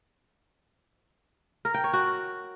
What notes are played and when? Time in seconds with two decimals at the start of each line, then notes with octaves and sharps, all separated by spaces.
1.65 A#4
1.74 G5
1.84 C#5
1.93 F#4